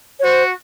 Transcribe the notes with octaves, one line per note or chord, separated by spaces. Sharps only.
C#5
F#4 C5